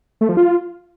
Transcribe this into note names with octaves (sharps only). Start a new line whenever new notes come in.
A3
F3
F4